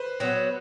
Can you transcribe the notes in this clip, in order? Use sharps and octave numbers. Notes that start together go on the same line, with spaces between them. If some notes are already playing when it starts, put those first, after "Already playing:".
Already playing: B4 C5
F#3 B3